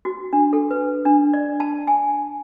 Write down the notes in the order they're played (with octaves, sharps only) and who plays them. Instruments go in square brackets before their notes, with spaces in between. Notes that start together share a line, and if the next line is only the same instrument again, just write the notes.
[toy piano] F#4
D4
A4
B4
D4
D5
A5
G#5